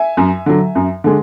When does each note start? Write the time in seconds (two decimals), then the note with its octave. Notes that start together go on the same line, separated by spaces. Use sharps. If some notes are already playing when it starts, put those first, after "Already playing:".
Already playing: E5 G#5
0.17 F#2
0.46 D3 F#3
0.75 F#2
1.04 D3 G#3